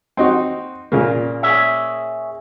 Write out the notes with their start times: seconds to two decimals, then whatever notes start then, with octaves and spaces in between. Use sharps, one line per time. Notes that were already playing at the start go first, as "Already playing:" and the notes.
0.17 C4 D#4 F#4
0.92 A#2 C#3 A#3
1.43 G#4 C#5 E5